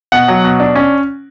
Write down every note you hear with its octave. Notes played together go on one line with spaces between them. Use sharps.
B2 F#5
F#3
B2
D4
C#4